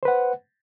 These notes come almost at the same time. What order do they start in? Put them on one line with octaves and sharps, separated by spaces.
C5 B4 F#5